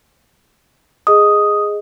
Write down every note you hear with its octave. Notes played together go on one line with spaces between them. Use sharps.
G#4 D#5 D#6